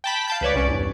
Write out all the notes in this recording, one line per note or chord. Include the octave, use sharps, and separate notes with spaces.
G5 A5 B5
F5 A5 G6
C#2 B4 C#5 D5
C2 C#4 D5
E2 G2